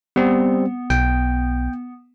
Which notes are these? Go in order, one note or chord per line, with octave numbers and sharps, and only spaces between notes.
G3 B3 C4
B1 G5